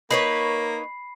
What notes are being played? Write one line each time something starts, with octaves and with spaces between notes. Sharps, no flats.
A#3 D#4 B4 C#5 B5 C7